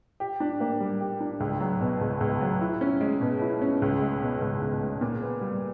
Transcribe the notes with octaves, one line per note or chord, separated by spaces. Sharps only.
G4
D4
A#3
G3
G4
D4
C#2
F#3
B2
C#2
C#2
F#3
E4
C#4
G#3
B2
E4
C#4
C#2
G#3
B2
C#2
C#2
G#3
A#2
B3
G3